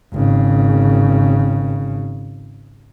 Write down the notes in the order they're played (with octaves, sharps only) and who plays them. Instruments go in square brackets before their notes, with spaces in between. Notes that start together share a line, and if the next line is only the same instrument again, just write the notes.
[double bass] G#1 C#3